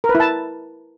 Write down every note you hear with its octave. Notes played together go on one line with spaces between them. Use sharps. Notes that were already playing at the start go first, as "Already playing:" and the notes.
A#4
B4
E4
A5